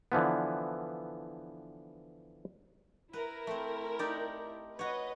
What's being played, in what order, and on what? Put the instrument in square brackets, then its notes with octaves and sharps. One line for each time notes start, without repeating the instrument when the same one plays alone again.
[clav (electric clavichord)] D3 E3 F3 B3
[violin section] E4 A#4 [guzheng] B4
[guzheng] A3 C4
D#4 G4 D5
[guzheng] F#4 C#5 [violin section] B4 D#5